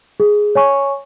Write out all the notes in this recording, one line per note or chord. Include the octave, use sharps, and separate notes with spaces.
G#4
C#5 G#5 C#6